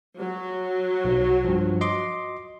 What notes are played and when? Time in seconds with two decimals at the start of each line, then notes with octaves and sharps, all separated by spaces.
0.17 F#3
1.05 B1
1.44 G2 F3
1.81 D#5 C6 D6